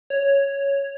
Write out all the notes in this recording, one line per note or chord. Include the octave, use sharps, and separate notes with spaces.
C#5